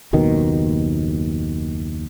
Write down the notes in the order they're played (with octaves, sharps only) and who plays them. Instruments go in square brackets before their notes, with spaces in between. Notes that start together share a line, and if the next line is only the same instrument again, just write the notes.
[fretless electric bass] F#1 D#2 B2 D#3